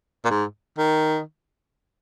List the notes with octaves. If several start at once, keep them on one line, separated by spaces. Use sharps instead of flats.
A#2
G#2
D#3